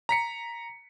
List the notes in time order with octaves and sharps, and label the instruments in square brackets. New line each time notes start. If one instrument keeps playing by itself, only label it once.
[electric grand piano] A#5 B6 C#7